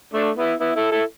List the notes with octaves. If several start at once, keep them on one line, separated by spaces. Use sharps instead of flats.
A3 D4
B3 E4
B3 E4
E4 A4
E4 A4